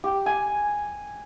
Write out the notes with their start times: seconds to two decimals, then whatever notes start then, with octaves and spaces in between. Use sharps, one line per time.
0.04 G4
0.26 G#5